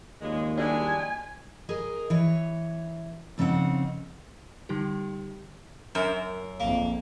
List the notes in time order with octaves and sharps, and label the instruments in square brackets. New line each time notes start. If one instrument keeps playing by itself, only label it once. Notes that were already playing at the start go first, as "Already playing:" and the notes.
[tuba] D#2 [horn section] A#2 C#3 G#3
[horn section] G3 G#3 [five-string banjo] D4 E4 F#4 [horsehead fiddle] G#5
[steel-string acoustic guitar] G#4 A#4 D#5
E3 C#5
F2 C#3 C4 D#4 F#5
[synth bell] D3 G3 D#4 G4
[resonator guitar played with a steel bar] F#2 [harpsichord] A#4
[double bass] A#1 F2 [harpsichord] A#3